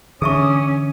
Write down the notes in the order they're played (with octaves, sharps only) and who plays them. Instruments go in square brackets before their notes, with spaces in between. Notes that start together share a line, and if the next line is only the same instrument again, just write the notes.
[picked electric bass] D3 E3 D4 [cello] C#4 [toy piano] G#4 E5 C#6 [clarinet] D#6